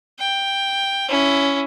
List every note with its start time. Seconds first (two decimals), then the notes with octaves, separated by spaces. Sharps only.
0.19 G5
1.09 C#4 E4